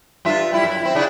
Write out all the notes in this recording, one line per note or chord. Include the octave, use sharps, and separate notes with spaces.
G2 F4 E5
G3 E4
F#2 E4
C4 E4
C#3 D4 E4